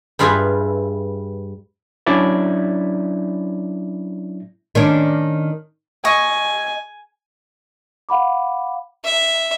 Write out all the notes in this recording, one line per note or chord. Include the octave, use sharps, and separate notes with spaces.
G2 G3 F4 G#4 B4 E5
F#3 C#4 D4 E4 D5 E5
D#3 C#4 D4
D#5 G#5 C#6
F5 F#5 B5 D6
E5